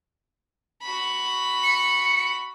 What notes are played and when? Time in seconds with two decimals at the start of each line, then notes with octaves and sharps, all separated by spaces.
0.82 F#4 B5
1.63 C#7